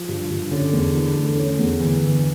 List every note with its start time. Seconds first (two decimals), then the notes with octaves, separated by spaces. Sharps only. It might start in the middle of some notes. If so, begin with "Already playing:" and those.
Already playing: F3
0.09 G2
0.30 G2
0.51 D3 C#4
0.73 E2
0.95 E3
1.16 A3
1.37 C#4
1.59 E2
1.80 G1 E3
2.02 G1